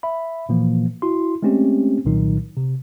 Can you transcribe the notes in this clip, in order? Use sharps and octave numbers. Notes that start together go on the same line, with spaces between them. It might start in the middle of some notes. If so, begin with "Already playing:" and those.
E5 B5
A#2 E3 F3 A#3
E4 F#4 C6
G#3 A3 C4 C#4 G4
C2 A#2 D#3 F#3 D#4
C3